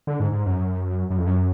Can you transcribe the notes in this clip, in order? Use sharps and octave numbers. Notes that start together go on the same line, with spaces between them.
D3
G#2
G#2
F#2
F#2
F2
F#2